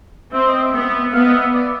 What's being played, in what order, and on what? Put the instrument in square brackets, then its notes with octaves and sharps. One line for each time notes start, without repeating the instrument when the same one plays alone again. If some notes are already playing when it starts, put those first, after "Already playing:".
[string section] C4 [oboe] E5
[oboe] D#5
E5
[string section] B3
[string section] B3 [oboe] F5
[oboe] D#5
E5
D5